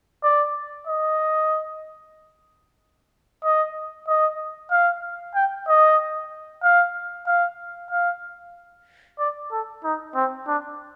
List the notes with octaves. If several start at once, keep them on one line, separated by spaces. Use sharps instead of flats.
D5
D#5
D#5
D#5
F5
G5
D#5
F5
F5
F5
D5
A4
D#4
C4
D4